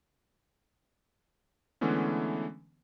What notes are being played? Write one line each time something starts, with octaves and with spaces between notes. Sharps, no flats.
D3 E3 G#3 A3 B3 C#4